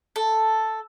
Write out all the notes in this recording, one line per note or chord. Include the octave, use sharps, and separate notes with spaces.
A4